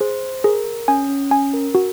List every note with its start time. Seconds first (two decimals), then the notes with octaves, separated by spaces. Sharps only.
0.01 G#4 C5
0.44 G#4 A#4
0.88 C#4 G#5
1.09 C#4
1.31 C#4 G#5
1.54 A#4
1.75 F#4